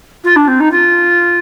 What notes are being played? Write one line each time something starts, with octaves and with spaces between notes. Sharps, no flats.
F4
D4
C4
D#4
F4